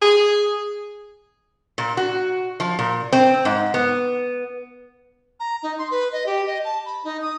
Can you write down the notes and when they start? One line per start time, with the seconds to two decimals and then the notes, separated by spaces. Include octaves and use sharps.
0.02 G#4
1.78 A#2
1.97 F#4
2.60 F3
2.79 A#2
3.13 C4
3.45 G#2
3.74 B3
5.40 A#5
5.63 D#4
5.79 C6
5.91 B4
6.12 D#5
6.26 G4
6.47 D#5
6.65 A5
6.86 B5
7.04 D#4
7.22 D#6